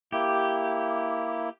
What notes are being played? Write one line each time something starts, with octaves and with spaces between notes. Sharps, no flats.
A#3 E4 G4